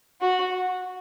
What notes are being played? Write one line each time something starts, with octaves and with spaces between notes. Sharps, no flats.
F#4